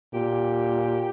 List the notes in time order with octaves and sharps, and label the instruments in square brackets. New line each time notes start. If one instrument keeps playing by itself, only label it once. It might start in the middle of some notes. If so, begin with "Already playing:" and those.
[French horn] A#2 [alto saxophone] G4